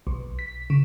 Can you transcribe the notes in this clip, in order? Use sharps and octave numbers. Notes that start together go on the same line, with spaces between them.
B1
B6
C#3